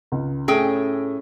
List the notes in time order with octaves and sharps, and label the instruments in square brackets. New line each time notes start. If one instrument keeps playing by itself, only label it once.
[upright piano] C#2
[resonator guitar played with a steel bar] A2 G#4 G5 [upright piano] A3 C#4